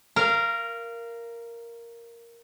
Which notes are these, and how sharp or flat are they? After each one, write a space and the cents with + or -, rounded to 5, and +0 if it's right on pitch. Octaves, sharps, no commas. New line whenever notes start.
A#4 +0 F5 -20 A#5 -25